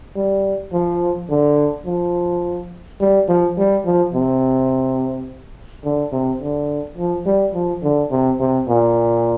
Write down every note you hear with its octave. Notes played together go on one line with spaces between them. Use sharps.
G3
F3
D3
F3
G3
F3
G3
F3
C3
D3
C3
D3
F3
G3
F3
D3
C3
C3
A#2